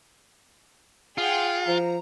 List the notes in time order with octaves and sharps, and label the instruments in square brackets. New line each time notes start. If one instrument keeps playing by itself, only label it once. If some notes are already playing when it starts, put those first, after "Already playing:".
[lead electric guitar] F4 [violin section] G#4 F#5 G5
[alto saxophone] F3 [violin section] A#5